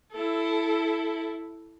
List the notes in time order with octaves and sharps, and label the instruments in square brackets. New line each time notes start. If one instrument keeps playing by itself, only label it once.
[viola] E4 A4